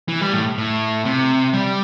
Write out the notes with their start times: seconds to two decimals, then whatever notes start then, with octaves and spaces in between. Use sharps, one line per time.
0.08 E3
0.21 G3
0.33 A2
0.58 A2
1.05 C3
1.53 G3